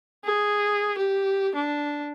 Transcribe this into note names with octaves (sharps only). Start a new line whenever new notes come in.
G#4
G4
D4